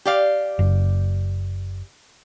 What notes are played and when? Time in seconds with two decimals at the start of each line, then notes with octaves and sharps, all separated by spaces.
0.05 G4 D5 F5
0.59 F#1